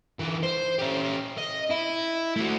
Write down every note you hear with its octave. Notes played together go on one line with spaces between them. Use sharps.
D3 E3
C5
C#4 G4
D#5
E4
A3 F#4